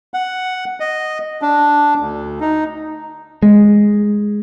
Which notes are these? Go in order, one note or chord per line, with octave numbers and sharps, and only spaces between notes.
F#5
D#5
D4
D2
D#4
G#3